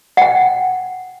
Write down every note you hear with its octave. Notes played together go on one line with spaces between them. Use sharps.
F#5 G5